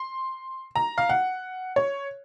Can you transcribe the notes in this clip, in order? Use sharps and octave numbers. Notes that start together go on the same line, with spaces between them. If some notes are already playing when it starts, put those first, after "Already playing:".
Already playing: C6
A#5
F5
F#5
C#5